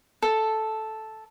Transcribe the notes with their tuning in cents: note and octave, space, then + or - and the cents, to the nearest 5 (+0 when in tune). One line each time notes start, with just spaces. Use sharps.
A4 -5